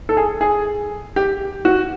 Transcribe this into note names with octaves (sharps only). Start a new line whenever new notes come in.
A4
G#4
G#4
G4
F#4